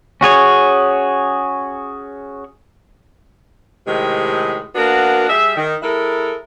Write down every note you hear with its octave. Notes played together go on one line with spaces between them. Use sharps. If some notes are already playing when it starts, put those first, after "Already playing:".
C#4 F#4 G#4 C#5
A2 C3 D#3 G#3
A#3 B3 D4 F#4 A#4
G3 G#4 E5
D#3
G#3 E4 A4 A#4